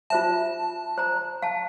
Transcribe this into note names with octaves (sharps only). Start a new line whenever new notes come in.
F4 C5 E5 A5
C5 A#5
F5 A5